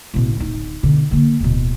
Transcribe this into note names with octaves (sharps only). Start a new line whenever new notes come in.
A1 B2
D1 D#4
B2 D3
D3 A#3
D1 B2